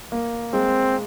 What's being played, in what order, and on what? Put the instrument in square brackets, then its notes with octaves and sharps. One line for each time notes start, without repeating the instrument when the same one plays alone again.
[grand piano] A#3
[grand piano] G#3 [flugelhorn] C4